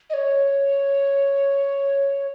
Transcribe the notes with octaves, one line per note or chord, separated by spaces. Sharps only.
D#5
C#5